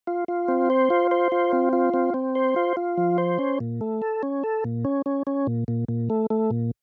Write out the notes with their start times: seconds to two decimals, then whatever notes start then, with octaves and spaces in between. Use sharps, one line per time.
0.07 F4
0.28 F4
0.48 C4
0.70 C5
0.90 F4
1.11 C5
1.32 F4
1.53 C4
1.73 F4
1.94 C4
2.14 C4
2.35 C5
2.56 F4
2.77 F4
2.97 F3
3.18 C5
3.39 C#4
3.60 A#2
3.81 A3
4.02 A4
4.23 C#4
4.44 A4
4.64 A#2
4.85 C#4
5.06 C#4
5.27 C#4
5.47 A#2
5.68 A#2
5.88 A#2
6.10 A3
6.30 A3
6.51 A#2